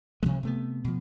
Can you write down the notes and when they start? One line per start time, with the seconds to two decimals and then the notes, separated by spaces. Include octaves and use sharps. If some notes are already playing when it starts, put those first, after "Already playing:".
0.23 D2 C3 F3 G#3
0.43 C3 A3 B3
0.84 B2 F3